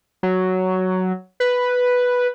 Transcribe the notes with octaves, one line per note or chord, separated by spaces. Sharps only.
F#3
B4